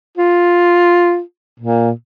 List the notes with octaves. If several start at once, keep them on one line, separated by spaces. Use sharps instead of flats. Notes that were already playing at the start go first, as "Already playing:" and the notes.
F4
A#2